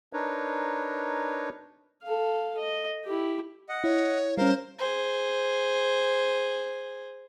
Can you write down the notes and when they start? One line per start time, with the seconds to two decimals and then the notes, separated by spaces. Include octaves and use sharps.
0.13 D4 D#4 A#4 B4 C#5
2.03 A4 F5
2.57 D#5
3.05 E4 G4
3.69 D#5 F#5
3.84 E4 C#5
4.37 G3 C#4 A#4 C5 F5
4.78 G#4 C5